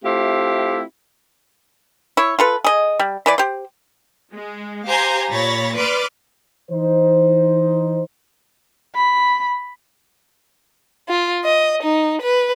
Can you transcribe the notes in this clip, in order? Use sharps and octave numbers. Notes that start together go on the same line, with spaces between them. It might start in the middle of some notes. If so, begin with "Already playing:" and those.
A3 C4 E4 F4 G4
E4 C#5
F4 A4 B4
G#4 D#5
G3
E3 B4 D5
G4 C5
G#3
G4 C5 F5 G#5 A#5
A#2 C#5 B5 A6 A#6
B4 D5 C6 D6 F6
E3 D#4 C5
B5
F4
D#5
D#4
B4